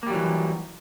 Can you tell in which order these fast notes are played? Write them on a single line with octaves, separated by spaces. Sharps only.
A#3 G3 F#3 E3